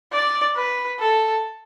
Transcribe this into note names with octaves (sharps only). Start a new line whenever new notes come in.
D5
B4
A4